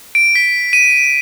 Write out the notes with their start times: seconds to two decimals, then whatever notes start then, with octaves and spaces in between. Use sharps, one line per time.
0.15 D7
0.35 B6
0.73 D#7